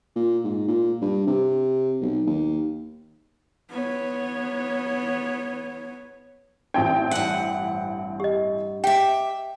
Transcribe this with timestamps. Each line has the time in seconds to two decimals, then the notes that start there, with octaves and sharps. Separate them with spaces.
0.16 A#2
0.44 G#2
0.67 A#2
1.02 G2
1.27 C3
2.01 B1
2.26 D#2
3.71 B3 C#5
6.74 A1 C4 D#4 G5
7.11 G2 F#5
8.20 G4 D#5
8.84 G4 E5 G5